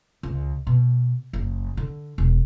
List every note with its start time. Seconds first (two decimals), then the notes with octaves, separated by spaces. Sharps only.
0.23 C#2
0.67 B2
1.33 F#1
1.77 D3
2.18 E1